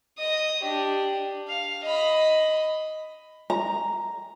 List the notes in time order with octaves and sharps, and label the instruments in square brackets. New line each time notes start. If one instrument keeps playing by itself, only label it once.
[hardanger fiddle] D#5 D#6
D4 G4
F5
D#5 B5
[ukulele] A#5